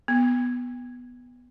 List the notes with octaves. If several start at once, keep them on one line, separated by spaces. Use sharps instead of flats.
B3